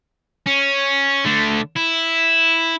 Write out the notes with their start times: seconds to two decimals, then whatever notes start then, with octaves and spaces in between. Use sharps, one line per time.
0.46 C#4
1.26 D3 A3
1.77 E4